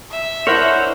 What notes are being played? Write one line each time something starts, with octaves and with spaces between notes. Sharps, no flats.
E5
D4 E4 A#4 C5 C#5 F#5